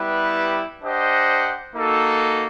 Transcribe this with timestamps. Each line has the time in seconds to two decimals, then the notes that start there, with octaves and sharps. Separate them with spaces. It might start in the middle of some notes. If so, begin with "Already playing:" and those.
Already playing: G3 B3 E4 G4 B4
0.83 D4 G4 C5 D#5 F#5
1.76 A#3 D#4 F#4 A4